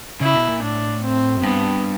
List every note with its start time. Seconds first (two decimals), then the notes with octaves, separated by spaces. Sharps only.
0.21 C#3 E4
0.35 B2
0.49 A#2
0.62 A2 D4
1.03 C4
1.37 F#2
1.43 G2 B3